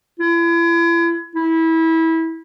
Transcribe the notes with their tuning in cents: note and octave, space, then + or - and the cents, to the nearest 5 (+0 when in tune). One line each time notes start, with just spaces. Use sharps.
E4 +40
E4 -20